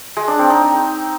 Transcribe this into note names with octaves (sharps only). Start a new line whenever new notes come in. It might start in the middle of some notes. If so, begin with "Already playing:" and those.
G#3
D4
C4
D#4